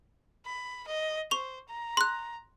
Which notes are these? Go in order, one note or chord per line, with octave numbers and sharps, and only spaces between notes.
B5
D#5
C5 C#6 F7
A#5
C6 F#6